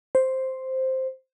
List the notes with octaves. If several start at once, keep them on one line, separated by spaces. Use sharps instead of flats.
C5